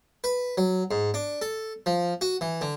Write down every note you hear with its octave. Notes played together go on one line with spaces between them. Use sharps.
B4
F#3
G#2
D4
A4
F3
F#4
E3
D3